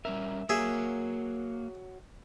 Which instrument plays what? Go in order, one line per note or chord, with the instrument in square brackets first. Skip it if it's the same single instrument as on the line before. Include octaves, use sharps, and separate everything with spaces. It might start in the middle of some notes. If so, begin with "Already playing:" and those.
[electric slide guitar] G3 C#4 A#4 [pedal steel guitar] E5
[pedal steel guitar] A#3 [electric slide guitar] F#4 C#5 [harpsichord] G#4 E5